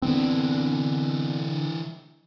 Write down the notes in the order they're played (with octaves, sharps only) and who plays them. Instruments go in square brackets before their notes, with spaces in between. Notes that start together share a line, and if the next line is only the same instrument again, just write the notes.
[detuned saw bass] D3 [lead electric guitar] E3 D4 [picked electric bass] B3 C4